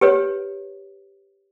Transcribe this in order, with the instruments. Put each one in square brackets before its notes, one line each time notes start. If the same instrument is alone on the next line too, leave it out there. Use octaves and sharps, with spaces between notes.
[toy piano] G4 B4 C#5